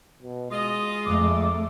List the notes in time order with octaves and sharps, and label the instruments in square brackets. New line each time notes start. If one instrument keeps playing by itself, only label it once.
[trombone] B2
[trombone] G#3 [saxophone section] F4 D#5 [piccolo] D#6
[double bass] F2 A3 [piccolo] D6